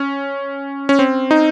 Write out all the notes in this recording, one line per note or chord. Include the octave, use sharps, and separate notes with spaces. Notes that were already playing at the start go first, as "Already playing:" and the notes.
Already playing: C#4
C#4
C4
D#4